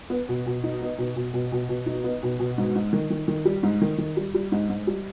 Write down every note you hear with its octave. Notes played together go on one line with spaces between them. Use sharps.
B3
B2
B2
D#4
B3
B2
B2
B2
B2
B2
D#4
B3
B2
B2
G#2
G#2
D#3
D#3
D#3
G3
G#2
D#3
D#3
G3
G3
G#2
G#2
G3